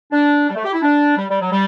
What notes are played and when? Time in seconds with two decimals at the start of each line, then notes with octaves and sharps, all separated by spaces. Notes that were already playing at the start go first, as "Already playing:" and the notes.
0.11 D4
0.49 G3
0.55 A3
0.64 G4
0.73 E4
0.82 D4
1.17 G3
1.29 G3
1.40 F#3
1.51 G3